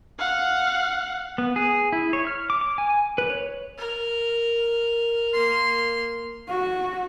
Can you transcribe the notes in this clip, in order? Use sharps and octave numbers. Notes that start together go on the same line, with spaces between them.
F5 F#5
B3
G#4
E4
C#5
F6
D6
D6
G#5
B4
C#5
A#4
A#3 C6
F#4